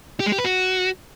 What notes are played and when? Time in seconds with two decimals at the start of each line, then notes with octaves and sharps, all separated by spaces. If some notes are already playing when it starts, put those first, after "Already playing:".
0.20 G4
0.26 G#3
0.32 G4
0.38 B4
0.45 F#4